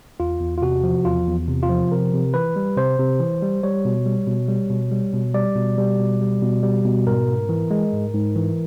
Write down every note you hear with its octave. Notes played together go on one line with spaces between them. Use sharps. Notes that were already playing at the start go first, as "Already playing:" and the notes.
E2 F4
E2
F4
C3 F#4
F3
E2 F4
E2
C3
F4
F3
C3 A#4
C3
E3 B4
G3
C3 C5
C3
E3
G3
G3 C#5
B2
G3
B2
G3
B2
G3
B2
G3 D5
B2
G3
B2
G3
B2
G3
B2
G#2 A#4
G#2
E3
G#3
G#2
G#2
E3